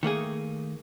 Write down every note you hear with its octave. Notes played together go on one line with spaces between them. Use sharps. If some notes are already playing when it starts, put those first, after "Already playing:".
D#3 A3 A#3 G#4